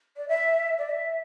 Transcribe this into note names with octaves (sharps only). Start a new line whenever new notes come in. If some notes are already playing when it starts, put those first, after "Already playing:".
D5
E5
D5
E5